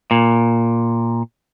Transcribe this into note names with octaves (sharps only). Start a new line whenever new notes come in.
A#2